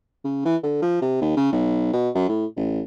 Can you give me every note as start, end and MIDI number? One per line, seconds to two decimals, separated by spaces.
0.24 0.44 49
0.45 0.56 52
0.63 0.79 50
0.82 0.99 53
1.02 1.18 48
1.22 1.34 39
1.37 1.52 49
1.53 1.92 35
1.93 2.10 47
2.15 2.28 42
2.29 2.46 45
2.56 2.82 33